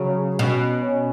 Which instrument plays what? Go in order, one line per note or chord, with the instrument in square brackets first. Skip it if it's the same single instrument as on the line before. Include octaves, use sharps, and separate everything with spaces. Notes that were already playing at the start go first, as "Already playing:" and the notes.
Already playing: [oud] C#3 [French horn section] F#3
[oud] B2 [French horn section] C#4
[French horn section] C#4